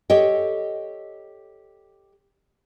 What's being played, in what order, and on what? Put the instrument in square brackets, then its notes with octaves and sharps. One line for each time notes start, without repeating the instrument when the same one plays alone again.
[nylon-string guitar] G4 A4 C#5 D#5 G5